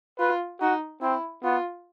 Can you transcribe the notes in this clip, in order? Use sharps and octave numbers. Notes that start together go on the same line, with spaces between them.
F4 B4
D#4 F#4
C4 E4
B3 F4